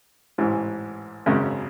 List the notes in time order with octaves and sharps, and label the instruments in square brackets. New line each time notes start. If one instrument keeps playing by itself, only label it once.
[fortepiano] A1 G#2 E3
G#1 F#2 C#3 G#3